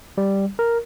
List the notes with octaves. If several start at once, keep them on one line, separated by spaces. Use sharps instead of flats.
G3
A#4